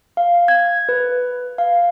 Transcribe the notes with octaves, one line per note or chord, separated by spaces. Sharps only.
F5
G#6
B4
F5